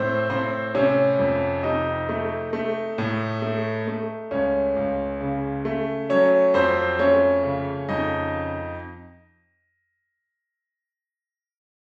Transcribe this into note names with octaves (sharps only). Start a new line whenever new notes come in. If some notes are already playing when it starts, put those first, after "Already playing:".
Already playing: A2 C4 C5
A2 C4 C5
C3 C#4 C#5
F2
C3 D#4 D#5
A3
A3
A2
A3
A3
C#2 C#4 C#5
C#2
C#3
A3
F#3 C#4 C#5
F2 C4 C5
A3 C#4 C#5
C#3
F2 D#4 D#5